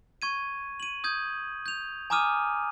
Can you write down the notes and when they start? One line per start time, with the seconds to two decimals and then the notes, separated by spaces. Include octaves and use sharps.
0.22 C#6 G#6 D#7
0.80 D#7 F#7
1.04 D#6 G6 G#6
1.66 G6 F7
2.10 G#5 A#5 D6 D#6 F6 D#7